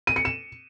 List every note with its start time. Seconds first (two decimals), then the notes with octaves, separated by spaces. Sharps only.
0.07 D#7
0.16 C#7
0.25 E7